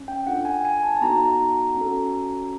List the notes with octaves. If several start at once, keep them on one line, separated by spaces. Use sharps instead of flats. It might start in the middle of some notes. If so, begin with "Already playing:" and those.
Already playing: C#4
G5
D4 F4 A4 F#5
G#5
G#5
A5
A5
B3 D#4 F#4 A4 A#5
C#4 F#4 A4